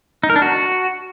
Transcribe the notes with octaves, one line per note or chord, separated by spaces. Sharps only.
D#4
A#4
D4
F#4